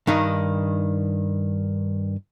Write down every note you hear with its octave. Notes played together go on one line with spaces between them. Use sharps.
G2 D#3 D#4